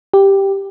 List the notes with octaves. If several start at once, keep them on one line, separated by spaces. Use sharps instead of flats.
G4